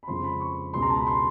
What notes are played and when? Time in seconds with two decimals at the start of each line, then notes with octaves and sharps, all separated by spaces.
0.03 B5
0.07 F2 C#3 F3 G#3 C6
0.24 B5
0.40 C#6
0.74 C#2 B2 G#3 C6
0.82 A#5
0.90 A5
1.00 B5
1.07 C6